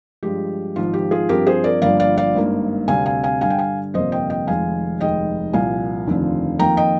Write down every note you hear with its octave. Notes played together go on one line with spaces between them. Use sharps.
G2 F3 G#3 G4
G#1 G#2 F3 F4
G4
F4 G#4
G2 F3 C4 G4 A#4
G#4 C5
A#4 D5
G1 G2 F3 A#3 D5 F5
D5 F5
D5 F5
G#1 G2 D#3 A#3
D2 C3 G3 C4 F5 G#5
F5 G#5
F5 G#5
G2 D3 G3 F5 G#5
G5
F5 G#5
G1 F2 C3 G3 A#3 C5 D#5
D#5 G5
D#5 G5
F1 F2 D#3 G#3 F5 G#5
F1 D#2 D#3 G#3 D#5 G5
C2 A#2 F3 F5 G#5
F1 D#2 D3 F3 C4
F2 D#3 A#3 G5 A#5
D#5 G5